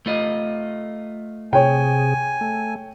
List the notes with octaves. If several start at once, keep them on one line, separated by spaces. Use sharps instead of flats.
A3 F4 D#5
C3 G#4 C#5 G5 G#5
A3